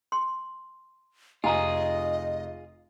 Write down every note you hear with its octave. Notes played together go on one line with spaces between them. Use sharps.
C6
F1 F4 G#4 D#5 G#5 A#5